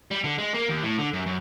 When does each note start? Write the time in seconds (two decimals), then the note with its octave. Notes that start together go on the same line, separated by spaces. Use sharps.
0.11 G3
0.24 D3
0.38 G#3
0.54 A#3
0.69 D#2
0.83 A2
0.98 D3
1.13 F#2
1.26 F#2